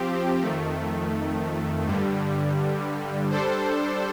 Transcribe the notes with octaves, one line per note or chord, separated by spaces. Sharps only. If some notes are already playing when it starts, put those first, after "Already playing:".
Already playing: F3 C4 G4
F2 D#3 A3
G2 D3 G3
G3 D4 A4 C5